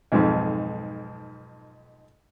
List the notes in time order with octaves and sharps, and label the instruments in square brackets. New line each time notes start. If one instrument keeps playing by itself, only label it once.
[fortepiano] B1 F2 G#2